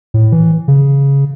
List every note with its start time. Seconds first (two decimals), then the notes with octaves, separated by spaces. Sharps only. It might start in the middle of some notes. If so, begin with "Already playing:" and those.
0.14 A2
0.32 E3
0.68 C#3